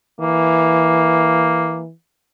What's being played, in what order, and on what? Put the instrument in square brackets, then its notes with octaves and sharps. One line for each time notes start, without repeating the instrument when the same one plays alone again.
[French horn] E3 [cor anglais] A#3